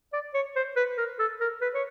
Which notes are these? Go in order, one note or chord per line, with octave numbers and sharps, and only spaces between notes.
D5
C#5
C5
B4
A#4
A4
A#4
B4
C#5